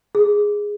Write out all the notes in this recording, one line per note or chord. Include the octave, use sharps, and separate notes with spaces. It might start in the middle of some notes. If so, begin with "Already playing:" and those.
G#4